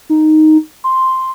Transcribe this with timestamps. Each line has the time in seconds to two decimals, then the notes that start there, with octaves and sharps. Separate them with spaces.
0.10 D#4
0.84 C6